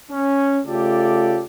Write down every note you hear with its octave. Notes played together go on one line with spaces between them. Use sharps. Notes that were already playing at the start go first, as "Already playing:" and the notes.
C#4
C#3 A3 F4 G4 A4 D5